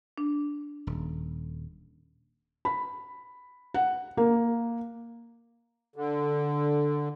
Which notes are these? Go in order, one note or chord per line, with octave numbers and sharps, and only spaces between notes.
D4
D#1
B5
F#5
A#3
D3